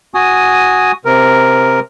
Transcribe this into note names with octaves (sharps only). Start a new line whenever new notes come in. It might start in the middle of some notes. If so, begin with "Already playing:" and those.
F#4 G#5 D#6
C3 A#4